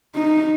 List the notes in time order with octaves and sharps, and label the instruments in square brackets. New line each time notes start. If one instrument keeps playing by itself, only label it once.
[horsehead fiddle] D#4